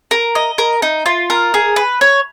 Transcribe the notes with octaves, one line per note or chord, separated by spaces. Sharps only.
A#4
D#5
A#4
D#4
F4
A#4
G#4
B4
C#5